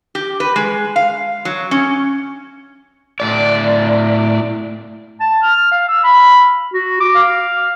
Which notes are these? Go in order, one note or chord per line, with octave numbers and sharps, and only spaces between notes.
G4
B4
G#3
F5
F#3
C#4
A2 D5
A5
F6
F5
E6
B5
F#4
D6
F5